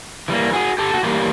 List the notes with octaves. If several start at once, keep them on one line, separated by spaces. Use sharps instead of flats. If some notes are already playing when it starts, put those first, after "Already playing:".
E3 G3 A#3
F#4 G#4
G4 A4
F#4
E3 G3 A#3 F4 G4